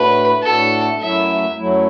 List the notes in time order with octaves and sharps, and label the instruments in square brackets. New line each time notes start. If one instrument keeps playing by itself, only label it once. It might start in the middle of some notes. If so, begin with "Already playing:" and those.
Already playing: [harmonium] A2 A3 D4 F#4 [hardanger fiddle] B4
[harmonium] A2 A3 D4 F#4 [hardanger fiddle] A4
[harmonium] F#2 F#3 A3 E4 [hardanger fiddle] E5
[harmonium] F#2 F#3 A3 E4